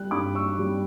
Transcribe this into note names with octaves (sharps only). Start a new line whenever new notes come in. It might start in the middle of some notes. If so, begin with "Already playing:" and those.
Already playing: G3 F#6
G2 B5 D6
C#6 E6
G3